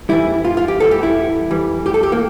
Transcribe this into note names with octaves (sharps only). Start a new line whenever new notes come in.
F2 E3 G3 E4
F4
F4
G4
E2 E3 G3 A4
G4
E4
F2 E3 G3
G4
A4
G4
A#3